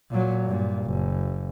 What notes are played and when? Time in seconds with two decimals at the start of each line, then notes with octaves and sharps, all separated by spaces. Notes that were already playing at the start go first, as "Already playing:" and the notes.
0.10 A#2 F#3
0.45 G2 A#2
0.84 F#1